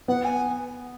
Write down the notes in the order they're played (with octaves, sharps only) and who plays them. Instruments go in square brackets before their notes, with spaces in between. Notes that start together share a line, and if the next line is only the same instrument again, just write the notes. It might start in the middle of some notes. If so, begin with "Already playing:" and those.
[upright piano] B3 [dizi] F#5
[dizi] G#5